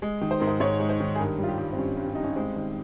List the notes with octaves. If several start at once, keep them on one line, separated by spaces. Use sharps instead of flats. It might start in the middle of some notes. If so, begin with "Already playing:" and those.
G#3
D#3
C5
G#2 A#4
C5
G#2 C#5
G#3
C5
D#3
G#4
G2 A#4
G3
F4
G4
G3
C4
G2 C#4
G2
C#4
G3 D#4
C#4
G#3 C4
D#3